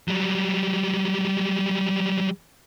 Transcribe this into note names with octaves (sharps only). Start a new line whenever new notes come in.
F#3 G3